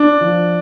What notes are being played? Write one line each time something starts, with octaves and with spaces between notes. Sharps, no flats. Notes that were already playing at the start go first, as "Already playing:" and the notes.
Already playing: D4
F3